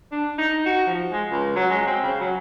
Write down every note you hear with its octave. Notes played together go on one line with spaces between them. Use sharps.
D4
D#4
F#4
F3
G#3
C#2
F#3
G#3
C4
C#3
F#3